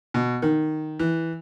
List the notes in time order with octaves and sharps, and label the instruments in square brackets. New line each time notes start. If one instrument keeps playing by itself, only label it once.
[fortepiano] B2
D#3
E3